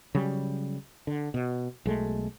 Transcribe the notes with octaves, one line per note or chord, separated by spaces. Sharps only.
C#3 F#3 G3
D3
B2
B1 G#3 A3